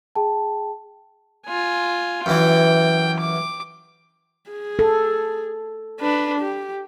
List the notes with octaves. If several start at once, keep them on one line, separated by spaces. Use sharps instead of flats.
G#4 G5 A5
F4 G#5
F#2 E3 G5
D6
G#4
A4
D4 B4
G4